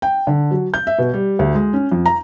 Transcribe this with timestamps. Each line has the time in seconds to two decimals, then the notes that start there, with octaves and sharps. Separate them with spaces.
0.02 G5
0.27 D3
0.51 F#3
0.74 G6
0.87 E5
0.98 B2
1.14 G3
1.39 D2
1.55 G#3
1.73 C#4
1.92 F2
2.06 A#5